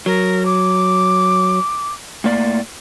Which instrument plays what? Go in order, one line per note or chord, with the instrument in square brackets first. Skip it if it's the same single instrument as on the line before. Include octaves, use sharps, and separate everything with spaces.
[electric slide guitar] F#3 [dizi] A#4
[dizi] D6
[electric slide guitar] A2 A#3 D5